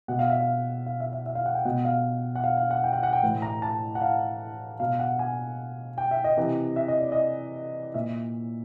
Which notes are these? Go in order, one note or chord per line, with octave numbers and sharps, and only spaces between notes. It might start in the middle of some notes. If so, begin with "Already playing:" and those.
B2 F#5
F5
E5
F5
F5
E5
E5
E5
F5
F#5
G5
B2 F#5
F5
F#5
F5
F5
F#5
G5
F#5
F#5
G5
A2 E3
A#5
A5
F#5
F5
B2 F5
F#5
G#5
G5
E5
D#5
C3 E3
E5
D#5
D5
D#5
A#2 E5